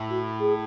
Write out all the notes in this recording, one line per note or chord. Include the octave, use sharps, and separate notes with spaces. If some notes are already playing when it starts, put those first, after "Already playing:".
Already playing: A2
F#4
G#4